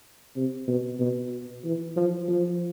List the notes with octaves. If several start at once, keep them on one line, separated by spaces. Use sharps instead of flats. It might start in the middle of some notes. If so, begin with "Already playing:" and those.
C3
B2
B2
E3
F3
F3